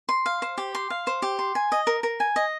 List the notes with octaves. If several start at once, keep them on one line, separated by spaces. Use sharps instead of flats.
C6
F5
C5
G4
C6
F5
C5
G4
C6
G#5
D#5
A#4
A#4
G#5
D#5